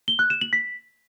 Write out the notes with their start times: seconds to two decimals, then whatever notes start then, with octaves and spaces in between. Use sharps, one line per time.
0.08 G7
0.19 F#6
0.30 E7
0.41 F#7
0.53 B6